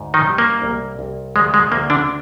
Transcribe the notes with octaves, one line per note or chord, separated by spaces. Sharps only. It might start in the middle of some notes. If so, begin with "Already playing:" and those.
Already playing: D2 G#2
D#3 D#4
G3
A#3
C2
C2
D2 G#3
G#3
D2 A#3
D3 D4